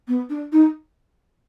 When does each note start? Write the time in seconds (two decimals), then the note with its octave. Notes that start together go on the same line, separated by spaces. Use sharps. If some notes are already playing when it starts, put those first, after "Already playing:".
0.08 B3
0.30 D4
0.52 D#4